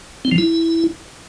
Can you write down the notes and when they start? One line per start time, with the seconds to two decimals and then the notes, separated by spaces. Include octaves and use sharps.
0.25 C4
0.32 F3
0.38 E4